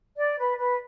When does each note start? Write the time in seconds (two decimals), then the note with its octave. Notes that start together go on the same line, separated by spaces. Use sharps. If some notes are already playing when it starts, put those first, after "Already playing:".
0.16 D5
0.37 B4
0.57 B4